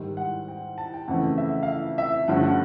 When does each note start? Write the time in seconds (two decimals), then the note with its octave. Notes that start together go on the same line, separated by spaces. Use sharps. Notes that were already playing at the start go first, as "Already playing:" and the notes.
Already playing: G#2 D#3 G3
0.17 F#5
0.48 G5
0.78 A5
0.93 G5
1.08 F2 C#3 E3 A3 F#5
1.38 E5
1.63 F5
1.68 E5
1.98 E5
2.28 G2 D3 F3 A3 C#4 F#5
2.43 F#5